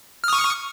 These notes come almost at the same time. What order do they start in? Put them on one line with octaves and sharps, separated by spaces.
F6 D#6 C#6